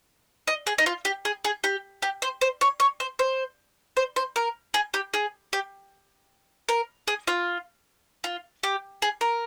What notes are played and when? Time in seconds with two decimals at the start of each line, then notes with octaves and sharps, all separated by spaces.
0.47 D#5
0.67 G#4
0.78 D#4
0.86 F4
1.05 G4
1.25 G#4
1.44 G#4
1.64 G4
2.02 G4
2.22 C5
2.41 C5
2.61 C#5
2.80 C#5
3.00 C5
3.19 C5
3.97 C5
4.16 C5
4.36 A#4
4.74 G#4
4.94 G4
5.14 G#4
5.53 G4
6.69 A#4
7.08 G#4
7.27 F4
8.24 F4
8.63 G4
9.02 G#4
9.21 A#4